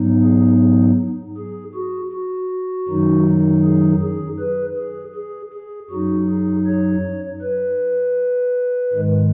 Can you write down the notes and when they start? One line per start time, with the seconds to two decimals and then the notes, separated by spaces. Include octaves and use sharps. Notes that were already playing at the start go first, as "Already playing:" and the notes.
Already playing: G#2 F#3 B3 D#4
0.23 G#4
1.37 G#4
1.75 F#4
2.13 F#4
2.88 F#2 D#3 F#3 D#4
3.64 G#4
4.02 G#4
4.40 B4
4.77 G#4
5.15 G#4
5.53 G#4
5.90 F#2 F#3 D#4 F#4
6.29 G#4
6.66 C#5
7.42 B4
8.93 G#2 D#3 G#3